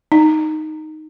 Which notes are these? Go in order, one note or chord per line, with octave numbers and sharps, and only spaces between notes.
D#4